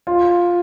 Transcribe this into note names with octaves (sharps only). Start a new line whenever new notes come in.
F4